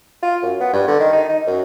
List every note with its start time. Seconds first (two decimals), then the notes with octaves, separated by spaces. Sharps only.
0.23 F4
0.42 F#2
0.60 B3
0.73 G2
0.88 D3
1.00 D#3
1.13 D#4
1.29 D#4
1.47 F#2